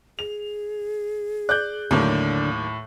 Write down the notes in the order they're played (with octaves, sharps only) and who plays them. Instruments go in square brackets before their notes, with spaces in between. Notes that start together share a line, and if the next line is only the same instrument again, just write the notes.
[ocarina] G#4 [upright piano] F7
[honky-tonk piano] D5 [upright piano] F#6 G6
[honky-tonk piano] D#2 F#3 A#3 [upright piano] A2 [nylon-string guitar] D3